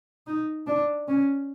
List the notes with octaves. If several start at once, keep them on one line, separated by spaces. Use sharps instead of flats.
D#4
D4
C#4